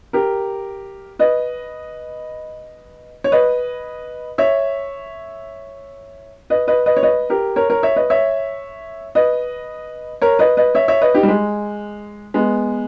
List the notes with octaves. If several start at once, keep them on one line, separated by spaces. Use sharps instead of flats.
G4 A#4
B4 D#5
C#5
B4 D#5
C#5 E5
B4 D#5
B4 D#5
B4 D#5
C#5
B4 D#5
G4 A#4
A#4 C#5
A#4 C#5
C#5 E5
B4 D#5
C#5 E5
B4 D#5
A#4 C#5
B4 D#5
B4 D#5
C#5 E5
C#5 E5
B4 D#5
D#4 G4
G3
G#3
G#3 B3